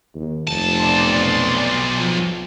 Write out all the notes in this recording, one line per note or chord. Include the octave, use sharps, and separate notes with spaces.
D#2
F1 B1 A5
D5 C6
F3